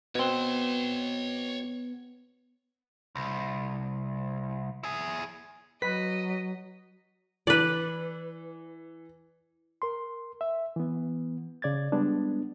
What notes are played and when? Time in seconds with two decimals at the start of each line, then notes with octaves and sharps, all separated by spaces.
0.15 B2 B3 C4 C#5 C6
3.16 C2
4.83 E4 G#4
5.82 F#3 B4 D#5 B6
7.47 E3 B4 D5
9.82 A#4 C6
10.41 E5
10.76 E3 B3
11.62 C#3 D5 G#6 A6
11.92 G3 G#3 B3 D4